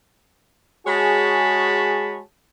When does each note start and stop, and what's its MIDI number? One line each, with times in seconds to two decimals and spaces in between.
0.86 2.20 56
0.86 2.20 66
0.86 2.20 68
0.86 2.20 73
0.86 2.20 81
0.86 2.20 83